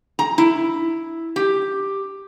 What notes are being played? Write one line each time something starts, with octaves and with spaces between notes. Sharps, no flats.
A#5
E4
G4